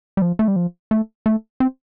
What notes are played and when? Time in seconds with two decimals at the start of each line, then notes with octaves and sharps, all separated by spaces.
0.17 G3
0.22 F3
0.39 A3
0.48 G3
0.56 F3
0.91 A3
1.26 A3
1.60 C4